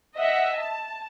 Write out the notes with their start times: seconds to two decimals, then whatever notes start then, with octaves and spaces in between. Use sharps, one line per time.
0.16 D#5 E5 F#5
0.55 A5